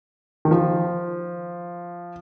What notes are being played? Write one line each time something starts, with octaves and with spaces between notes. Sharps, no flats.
D#3
F3